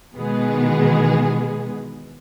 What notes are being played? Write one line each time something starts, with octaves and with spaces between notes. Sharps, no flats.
B2 D#3 E3 G#3 B3 G#4